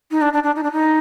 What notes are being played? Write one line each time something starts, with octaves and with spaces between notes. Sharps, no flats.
D#4
D4
D4
D4
D#4
D4
D#4